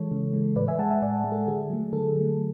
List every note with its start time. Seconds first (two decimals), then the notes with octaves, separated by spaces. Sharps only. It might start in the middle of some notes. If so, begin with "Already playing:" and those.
Already playing: E3 G#3 A4 C#5
0.11 C#3
0.33 E3 G#3
0.56 A2 B4 D5
0.68 E5 G#5
0.79 G#3 F#5 A5
0.90 E5 G#5
1.02 A2 D5 F#5
1.24 G#3
1.32 A4
1.47 D3 G#4
1.70 F#3 A3
1.93 D3 A4
2.16 F#3 A3